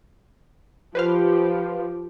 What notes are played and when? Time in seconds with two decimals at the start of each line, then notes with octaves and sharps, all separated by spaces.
0.95 F3 G4 B4 C5 F5